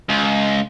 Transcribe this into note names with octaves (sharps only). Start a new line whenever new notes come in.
C#2